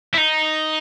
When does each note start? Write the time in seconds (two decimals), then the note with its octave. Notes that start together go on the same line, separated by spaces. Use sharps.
0.14 E4
0.18 D#4